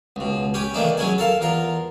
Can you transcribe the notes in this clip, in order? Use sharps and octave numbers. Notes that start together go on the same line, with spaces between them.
C#2 B2
C#4 G4 B4
D#3 E3 A3 A#3 D4 D#4
F#3 C#4 E4 G#4
A4 A#4 F5 A5
E2 F4 A#4 A#5